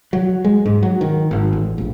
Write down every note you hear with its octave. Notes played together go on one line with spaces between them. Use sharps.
F#3
G#3
G#2
F#3
D#3
G#1
A1
A#1